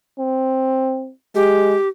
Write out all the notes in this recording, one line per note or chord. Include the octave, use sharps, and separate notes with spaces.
C4
G#3 G4